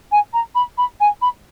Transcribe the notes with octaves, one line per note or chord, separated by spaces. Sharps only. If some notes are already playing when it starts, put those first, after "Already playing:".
G#5
A#5
B5
B5
G#5
B5